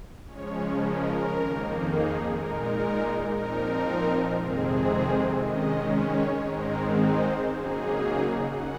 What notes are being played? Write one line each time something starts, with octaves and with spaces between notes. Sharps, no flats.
C#3 F3 G#3 C#4 C#5
A#4
F2 D#3 A#3 D#4
G#4
A#2 G#3 D#4 A#4
A#2 F3 C4 D#4 A#4
F2 C3 D#3 G#3 C4 G#4
D#3 G#3 C#4 D#5
C#5
G#2 D#3 G#3 C4 D#4 A#4
C5
C#3 F#3 A#3 D#4 G#4
C#3 F#5